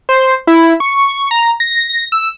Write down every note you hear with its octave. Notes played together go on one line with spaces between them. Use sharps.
C5
E4
C#6
A#5
A#6
E6